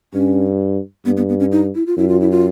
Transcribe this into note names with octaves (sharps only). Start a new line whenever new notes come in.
G2 C#4
G2 B3
B3
B3
C#4
D#4
E4
F4
F#2 E4
F4
E4
F4